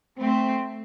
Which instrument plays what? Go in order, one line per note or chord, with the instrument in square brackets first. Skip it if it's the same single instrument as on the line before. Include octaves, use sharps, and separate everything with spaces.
[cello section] A3 C4